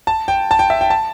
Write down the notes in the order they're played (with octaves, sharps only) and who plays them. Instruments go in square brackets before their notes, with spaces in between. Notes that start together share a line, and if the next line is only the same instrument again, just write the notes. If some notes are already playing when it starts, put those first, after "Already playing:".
[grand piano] A5
G5
A5
G5
E5
G5
A5